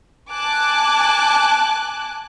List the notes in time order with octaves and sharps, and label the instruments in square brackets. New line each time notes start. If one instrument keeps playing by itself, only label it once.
[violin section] G#5 A5 D6 F#6